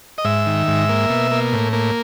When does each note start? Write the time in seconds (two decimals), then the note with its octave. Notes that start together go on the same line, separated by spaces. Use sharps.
0.18 D#5
0.25 G#2 E5
0.47 D#3
0.68 G#2
0.89 A#3
1.10 B2
1.31 A#3
1.53 A2
1.73 A#3